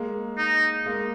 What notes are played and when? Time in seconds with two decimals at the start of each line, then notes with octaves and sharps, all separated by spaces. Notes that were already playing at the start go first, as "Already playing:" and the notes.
Already playing: G#3 A#3
0.38 D#4
0.86 G#3 A#3